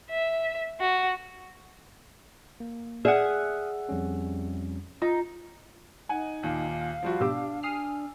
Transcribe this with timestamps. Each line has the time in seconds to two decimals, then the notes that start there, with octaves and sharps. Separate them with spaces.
0.11 E5
0.80 F#4
2.60 A#3
3.05 G#4 D5 E5 F#5 D#6 F6
3.89 F2 G3 C#4
5.02 D#4 F4
6.09 D#4 F#5 G#5
6.43 D#2 A#2 F5
7.03 F3 G3 F4 F#4
7.21 G#2 B2 D4 G4 D6 E6
7.63 G#5 D#6 F6 C7